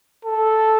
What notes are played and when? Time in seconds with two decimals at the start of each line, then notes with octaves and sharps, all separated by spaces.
0.25 A4